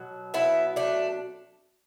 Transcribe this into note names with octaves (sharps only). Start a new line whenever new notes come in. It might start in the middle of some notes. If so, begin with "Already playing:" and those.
Already playing: B2 F#3
B3 E4
A3 D4